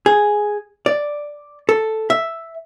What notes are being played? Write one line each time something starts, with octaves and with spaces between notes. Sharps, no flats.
G#4
D5
A4
E5